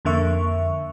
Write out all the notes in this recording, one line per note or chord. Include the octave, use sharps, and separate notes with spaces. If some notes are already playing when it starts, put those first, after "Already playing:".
F2 D3 A#3 E5 C#6